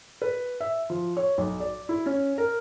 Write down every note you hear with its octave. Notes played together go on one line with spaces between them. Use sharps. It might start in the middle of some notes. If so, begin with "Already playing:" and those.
B4
E5
F3
C#5
B1
D5
E4
C#4
A#4